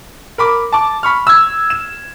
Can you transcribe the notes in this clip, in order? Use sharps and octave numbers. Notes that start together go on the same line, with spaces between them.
A#4 B5 D6
A5 D6
B5 C#6 F6
E6 G#6
E7